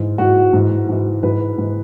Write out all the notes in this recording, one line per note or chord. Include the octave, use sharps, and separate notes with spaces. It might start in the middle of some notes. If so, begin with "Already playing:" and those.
Already playing: G#2 E3
G#2 E3 F#4
G#2 E3
G#2 E3
G#2 E3 B4
G#2
E3